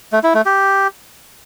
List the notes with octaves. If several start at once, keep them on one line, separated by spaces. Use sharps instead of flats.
A3
E4
A3
G4